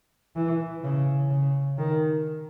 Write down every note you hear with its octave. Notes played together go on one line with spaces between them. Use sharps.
E3
C#3
C#3
D#3